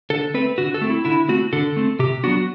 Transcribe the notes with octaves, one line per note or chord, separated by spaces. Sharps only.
D3 A4
A3 C4 B4
D3 F#4
A4
A3 C4
E4
D3 E4
A3 C4 F#4
D3 A4
A3 C4
C3 G4
F#3 B3 D4 F#4